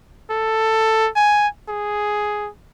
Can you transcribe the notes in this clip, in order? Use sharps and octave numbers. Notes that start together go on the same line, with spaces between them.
A4
G#5
G#4